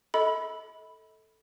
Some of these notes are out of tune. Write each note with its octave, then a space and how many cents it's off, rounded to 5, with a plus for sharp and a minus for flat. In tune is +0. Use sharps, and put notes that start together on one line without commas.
A4 +0 D#5 +40 B5 +0